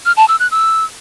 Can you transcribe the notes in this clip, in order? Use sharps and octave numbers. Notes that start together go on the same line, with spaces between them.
F6
A5
E6
F#6
E6